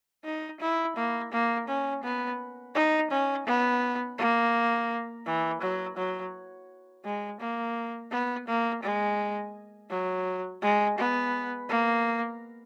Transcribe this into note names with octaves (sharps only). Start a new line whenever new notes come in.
D#4
E4
A#3
A#3
C#4
B3
D#4
C#4
B3
A#3
E3
F#3
F#3
G#3
A#3
B3
A#3
G#3
F#3
G#3
B3
A#3